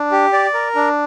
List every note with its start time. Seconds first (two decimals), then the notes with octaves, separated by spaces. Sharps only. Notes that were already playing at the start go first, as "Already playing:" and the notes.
Already playing: D4
0.12 G4
0.33 D5
0.54 A#4
0.75 D4